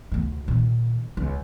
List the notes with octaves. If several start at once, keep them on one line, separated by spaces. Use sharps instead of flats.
D2 A3
A#2 D#3
C#2